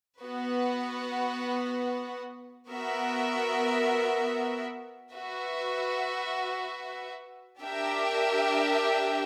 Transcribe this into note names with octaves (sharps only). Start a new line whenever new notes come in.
B3 F#4 B4 F#5
B3 F#4 A#4 E5
F#4 B4 E5
D4 G4 A#4 E5 G5